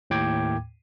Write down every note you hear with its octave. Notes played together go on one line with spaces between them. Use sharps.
D#2 A2 G5 D6 G#6